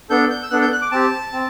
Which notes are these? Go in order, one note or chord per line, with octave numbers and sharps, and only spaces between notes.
B3 D4 A4 G6
G6
E6
B3 D4 A4 F#6
G6
F#6
D6
C4 G4 A5
C4